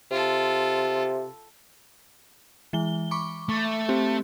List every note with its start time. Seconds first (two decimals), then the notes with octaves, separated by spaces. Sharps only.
0.11 C3 F4 A4
2.73 E3 G#3 G7
3.11 B5 C#6 D6
3.49 A3
3.89 C4 G4